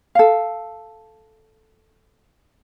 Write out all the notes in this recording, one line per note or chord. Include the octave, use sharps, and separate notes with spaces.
A4 F5